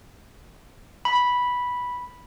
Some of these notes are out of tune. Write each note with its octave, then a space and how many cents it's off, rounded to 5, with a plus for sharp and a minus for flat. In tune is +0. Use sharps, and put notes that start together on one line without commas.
B5 -5